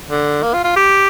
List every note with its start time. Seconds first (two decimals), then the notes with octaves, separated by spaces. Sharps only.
0.10 D3
0.43 A#3
0.54 F4
0.64 F4
0.76 G4